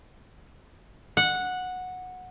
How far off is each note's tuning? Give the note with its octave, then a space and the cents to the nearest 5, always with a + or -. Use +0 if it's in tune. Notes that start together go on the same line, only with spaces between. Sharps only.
F#5 -10